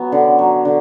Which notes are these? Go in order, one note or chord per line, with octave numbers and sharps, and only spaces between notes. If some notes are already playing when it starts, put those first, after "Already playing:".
Already playing: F#3 B3
D3
F#3
D3